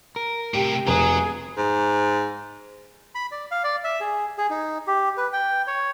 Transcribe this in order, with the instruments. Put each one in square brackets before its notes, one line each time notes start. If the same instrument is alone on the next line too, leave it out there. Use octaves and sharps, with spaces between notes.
[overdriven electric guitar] A#4
[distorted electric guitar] A2 C3 [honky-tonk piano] G4
[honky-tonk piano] F1 [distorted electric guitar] F#3 [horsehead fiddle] G#4 [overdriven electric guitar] A#5
[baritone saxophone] G#2
[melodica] B5
D5
F5
D5
E5
G#4
G#4
D#4
G4
B4
G5
C#5